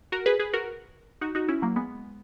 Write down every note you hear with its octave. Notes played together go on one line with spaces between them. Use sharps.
F#4 A#4
G#4 B4
G#4 B4
F#4 A#4
D#4 F#4
D#4 F#4
C#4 E4
F#3 A#3
G#3 B3